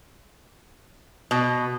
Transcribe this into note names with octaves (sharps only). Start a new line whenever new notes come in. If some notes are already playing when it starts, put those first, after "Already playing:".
B2